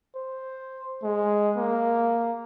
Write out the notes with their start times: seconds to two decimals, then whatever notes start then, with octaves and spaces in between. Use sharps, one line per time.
0.16 C5
1.03 G#3
1.57 A#3